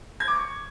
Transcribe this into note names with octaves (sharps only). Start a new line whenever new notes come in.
G#6
D6
C#6